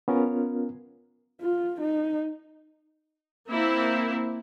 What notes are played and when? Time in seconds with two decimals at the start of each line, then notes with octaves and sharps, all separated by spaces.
0.08 B3 C#4 F4 A#4
1.41 F4
1.81 D#4
3.49 A#3 C4 E4